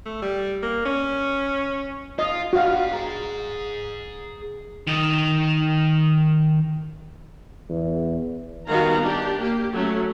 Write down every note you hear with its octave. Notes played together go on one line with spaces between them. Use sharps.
A3
G3
A#3
C#4
F4 D#5
G2 F#4 F5
G#4 A#5
D#3 D#5
E2
D#3 G3 B3 F#4 F5 A#5
D4 G4
A#3 G4
F#3 A3 C#4